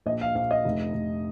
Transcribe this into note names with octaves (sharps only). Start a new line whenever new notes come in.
A#1 D#5
F5
A#1 F5
D#5
F1
F1